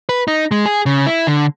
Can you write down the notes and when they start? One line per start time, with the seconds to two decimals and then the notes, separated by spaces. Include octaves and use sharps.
0.09 B4
0.28 D#4
0.51 G#3
0.66 G#4
0.86 C#3
1.06 E4
1.27 D3